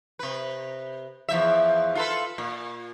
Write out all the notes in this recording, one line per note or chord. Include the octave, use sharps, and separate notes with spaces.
C3 B4
E2 F3 E5
F4 A4 B4
A#2